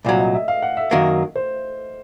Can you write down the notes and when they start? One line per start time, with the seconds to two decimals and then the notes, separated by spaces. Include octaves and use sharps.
0.05 C2 A#2 F#3 D5
0.19 D#5
0.34 E5
0.48 F5
0.62 F#5
0.77 E5
0.91 F#2 D#3 F#3 A#3
1.36 C5